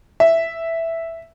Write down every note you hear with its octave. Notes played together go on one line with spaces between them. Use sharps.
E5